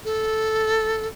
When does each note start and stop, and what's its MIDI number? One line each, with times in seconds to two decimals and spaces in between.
0.05 1.07 69